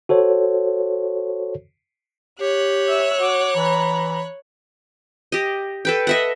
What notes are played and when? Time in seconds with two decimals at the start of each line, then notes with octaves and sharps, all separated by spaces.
0.09 F#4 A4 C5 C#5
2.40 G4 C#5 F#6
2.89 E5 E6
3.22 F#4 D6
3.56 E3 A#5 B5
5.32 G4 D#5
5.85 A4 B4 G5
6.07 D#5 E5 F#5